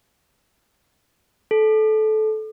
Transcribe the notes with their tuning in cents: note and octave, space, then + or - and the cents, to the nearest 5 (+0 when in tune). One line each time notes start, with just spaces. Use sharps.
A4 -20